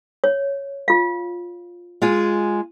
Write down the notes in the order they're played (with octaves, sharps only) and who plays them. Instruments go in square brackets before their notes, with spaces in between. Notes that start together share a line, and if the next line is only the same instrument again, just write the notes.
[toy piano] C#5
F4 F5
[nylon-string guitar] G#3 F4 G#4